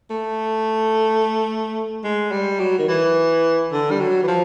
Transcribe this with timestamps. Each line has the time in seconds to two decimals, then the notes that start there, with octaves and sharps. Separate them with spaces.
0.10 A3
2.04 G#3
2.32 G3
2.60 F#3
2.79 D#3
2.88 E3
3.72 D3
3.91 G3
4.00 F#3
4.23 E3
4.28 F3